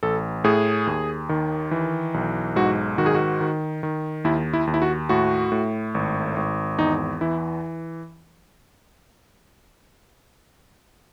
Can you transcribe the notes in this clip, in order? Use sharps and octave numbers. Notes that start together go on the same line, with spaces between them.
A1 A4
A2 G#4
D#2
D#3
E3
B1
G#2 F#4
D#3 F#4
G#4
F#4
D#3
D#3
D#2 E4
E4
D#2
E4
F#4
A2 F#4
A2
G#1
G#1
E2 D#4
E3 E4